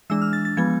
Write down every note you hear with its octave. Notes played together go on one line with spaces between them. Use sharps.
E3 G#3 D4 E6
F6
A6
A6
F3 G#3 B3 G#6